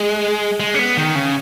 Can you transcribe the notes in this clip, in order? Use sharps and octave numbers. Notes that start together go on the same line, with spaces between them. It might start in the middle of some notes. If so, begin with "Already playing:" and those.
Already playing: G#3
G#3
C#4
B3
D#3
C#3